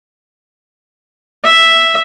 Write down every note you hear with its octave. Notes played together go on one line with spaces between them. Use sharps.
E5